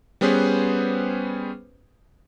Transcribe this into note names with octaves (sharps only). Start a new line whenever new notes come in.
G3 B3 C#4 G#4 B4 C5